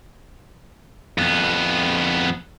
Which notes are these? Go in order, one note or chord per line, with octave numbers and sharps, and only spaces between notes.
F2 B3